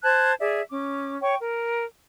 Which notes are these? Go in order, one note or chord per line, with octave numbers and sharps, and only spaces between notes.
C5 A5 F#6 G#6
G#4 D5 E5
C#4 D6
C#5 G5 C#6
A#4